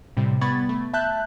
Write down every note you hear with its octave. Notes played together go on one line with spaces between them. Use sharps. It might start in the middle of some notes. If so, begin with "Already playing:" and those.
A2 C3 G3
G3 B3 B5 C#6 G#6 A6
A3
E5 A5 F#6 G6